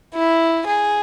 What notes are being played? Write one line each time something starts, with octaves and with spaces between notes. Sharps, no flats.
E4
G#4